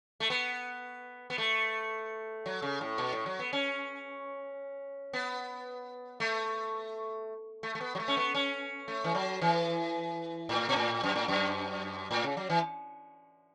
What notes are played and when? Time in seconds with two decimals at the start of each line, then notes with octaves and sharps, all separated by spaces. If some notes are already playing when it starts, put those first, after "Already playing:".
0.20 A3
0.30 B3
1.30 B3
1.38 A3
2.46 F#3
2.62 C#3
2.81 A2
2.98 B2
3.13 A2
3.26 F#3
3.39 B3
3.53 C#4
5.13 B3
6.20 A3
7.63 A3
7.75 A3
7.81 B3
7.95 F#3
8.00 A3
8.08 C#4
8.17 B3
8.34 C#4
8.88 A3
9.04 E3
9.15 F#3
9.42 E3
10.49 A2
10.69 B2
10.76 A2
11.03 F#2
11.16 A2
11.28 F#2
12.11 A2
12.24 C#3
12.37 F#3
12.50 E3